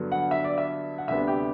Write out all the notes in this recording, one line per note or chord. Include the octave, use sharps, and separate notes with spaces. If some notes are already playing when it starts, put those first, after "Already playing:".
Already playing: G2 D3 F#3 B3
F#5
E5
D5
E5
F#5
D2 C3 G3 B3 D4 E5
G4